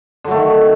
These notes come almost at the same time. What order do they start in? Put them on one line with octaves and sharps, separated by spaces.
D3 F#3 A3 D#3